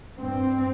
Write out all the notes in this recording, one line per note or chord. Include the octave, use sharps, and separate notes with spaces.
G2 C4